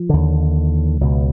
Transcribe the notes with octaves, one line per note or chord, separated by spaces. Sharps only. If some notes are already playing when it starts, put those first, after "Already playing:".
Already playing: F3
D#2 D3
C#2 B2